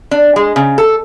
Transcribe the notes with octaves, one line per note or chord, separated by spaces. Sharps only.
D4
G#3
C#3
A4